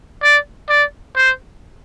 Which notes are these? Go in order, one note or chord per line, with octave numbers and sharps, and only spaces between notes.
D5
D5
C5